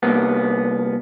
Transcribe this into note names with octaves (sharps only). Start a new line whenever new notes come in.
C2 A#3 B3